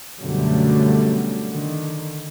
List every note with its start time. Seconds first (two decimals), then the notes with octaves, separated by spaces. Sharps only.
0.20 F#2 B2 D3 F#3 G3 A3
1.50 D3 D#3